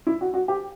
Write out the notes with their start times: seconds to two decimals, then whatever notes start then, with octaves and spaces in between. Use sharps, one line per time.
0.07 E4
0.21 F#4
0.34 F#4
0.48 G4